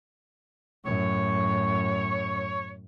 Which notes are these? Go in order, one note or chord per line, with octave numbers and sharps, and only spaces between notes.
F#2 A2 C#5